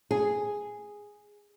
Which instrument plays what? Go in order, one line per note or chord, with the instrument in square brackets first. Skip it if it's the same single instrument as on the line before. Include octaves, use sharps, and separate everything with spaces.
[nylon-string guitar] G#4